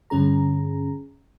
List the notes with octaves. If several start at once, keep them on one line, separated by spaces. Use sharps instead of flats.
G2 D3 C#4 G#4 A#5